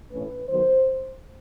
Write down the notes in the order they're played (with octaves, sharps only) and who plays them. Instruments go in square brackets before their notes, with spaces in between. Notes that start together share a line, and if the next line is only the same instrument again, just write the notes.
[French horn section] A2 E3 A3 C#4 B4
D#3 F#3 B3 C5